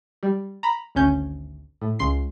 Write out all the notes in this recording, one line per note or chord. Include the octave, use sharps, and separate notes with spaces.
G3
A#5 B5
G#1 D2 C#4 G6
A2
C#2 C#3 C6 C7